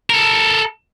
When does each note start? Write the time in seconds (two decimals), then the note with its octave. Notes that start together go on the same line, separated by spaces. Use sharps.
0.10 A4 A#4